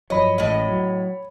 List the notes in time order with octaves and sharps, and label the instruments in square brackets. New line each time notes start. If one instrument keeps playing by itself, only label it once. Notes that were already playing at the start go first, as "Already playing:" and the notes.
[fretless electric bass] G2 F3 F#3 [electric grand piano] C#5 B5 [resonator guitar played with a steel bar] D#5
[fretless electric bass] A1 G#3 [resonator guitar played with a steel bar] A2 D#5
[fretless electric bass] F#3